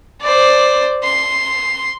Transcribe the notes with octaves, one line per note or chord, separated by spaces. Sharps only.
C5 D5
C6